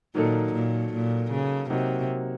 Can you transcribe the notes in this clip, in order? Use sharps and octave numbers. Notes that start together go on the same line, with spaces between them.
A#2 D#3 F#3 A#3 D#4 A4
A#2
A#2
C#3
C3 F#3 A#3 D#4 F#4